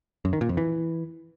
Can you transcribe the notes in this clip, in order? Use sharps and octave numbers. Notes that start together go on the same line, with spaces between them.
F#2
D#3
A#2
F2
E3